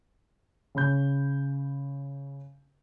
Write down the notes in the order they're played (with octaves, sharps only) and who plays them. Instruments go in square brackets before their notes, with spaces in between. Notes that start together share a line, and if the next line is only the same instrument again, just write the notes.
[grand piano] C#3 C#4 B5 G6